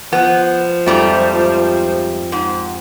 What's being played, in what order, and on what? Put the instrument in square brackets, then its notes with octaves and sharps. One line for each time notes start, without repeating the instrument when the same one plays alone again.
[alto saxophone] F3 [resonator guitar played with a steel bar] B3
[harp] F2 G4 [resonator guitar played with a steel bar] G#2 G3 A3
[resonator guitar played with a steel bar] G#2